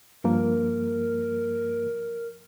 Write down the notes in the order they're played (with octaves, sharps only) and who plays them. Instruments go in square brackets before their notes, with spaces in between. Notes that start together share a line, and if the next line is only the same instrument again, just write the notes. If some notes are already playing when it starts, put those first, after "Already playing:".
[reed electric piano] G2 F3 A#3 [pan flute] A#4